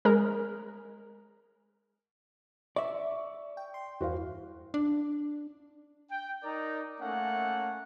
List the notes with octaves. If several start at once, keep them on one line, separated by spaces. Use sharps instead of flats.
G#3 A#4
D5 E5 C#6
G5
C6
E2 G2 E3 F#4 C5 F5
D4
G5
D#4 A#4 D5 A#5
A3 A#3 C#4 F#5